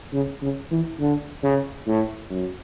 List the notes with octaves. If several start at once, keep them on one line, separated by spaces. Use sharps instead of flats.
C#3
C#3
E3
D3
C#3
A2
F#2